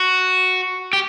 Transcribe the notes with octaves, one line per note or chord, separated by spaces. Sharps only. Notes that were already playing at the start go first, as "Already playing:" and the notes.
Already playing: F#4
G4